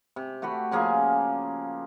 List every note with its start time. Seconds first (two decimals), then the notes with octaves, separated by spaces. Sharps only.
0.16 C3
0.42 A3 F#4 G4 B5
0.71 C#3 F3 A#3 G#4